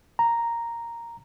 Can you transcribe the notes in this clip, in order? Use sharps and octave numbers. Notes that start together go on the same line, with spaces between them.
A#5